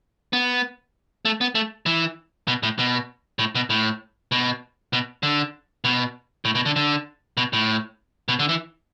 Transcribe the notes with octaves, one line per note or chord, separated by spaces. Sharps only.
B3
A3
B3
A3
E3
B2
A2
B2
A2
B2
A2
B2
B2
D3
B2
A2
B2
D3
D3
B2
A2
B2
D3
E3